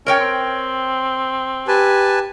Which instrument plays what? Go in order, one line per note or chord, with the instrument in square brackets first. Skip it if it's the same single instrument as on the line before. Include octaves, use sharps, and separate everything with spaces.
[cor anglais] C#4 [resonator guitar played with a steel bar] A#4 C#5 G5
[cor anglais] C4
[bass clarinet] G4 [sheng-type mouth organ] B4 G#5 A5